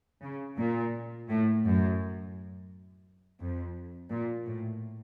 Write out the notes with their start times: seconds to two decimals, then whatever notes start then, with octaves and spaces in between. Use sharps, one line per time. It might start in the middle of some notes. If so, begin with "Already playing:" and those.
0.22 C#3
0.58 A#2
1.28 A2
1.64 F#2
3.40 F2
4.11 A#2
4.46 A2